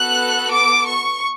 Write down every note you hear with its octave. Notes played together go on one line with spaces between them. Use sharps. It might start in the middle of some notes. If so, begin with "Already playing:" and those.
Already playing: B3 F#4 A4 F#6
D6
C#6